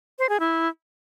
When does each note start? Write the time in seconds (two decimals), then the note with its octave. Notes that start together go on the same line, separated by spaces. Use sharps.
0.19 C5
0.29 G#4
0.40 E4